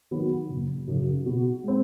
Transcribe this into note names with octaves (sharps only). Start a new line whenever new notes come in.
D#3 F#3 B3
F#1
F#2 C#3
B2
G#3 C4